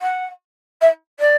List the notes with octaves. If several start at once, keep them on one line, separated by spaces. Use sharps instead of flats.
F#5
E5
D5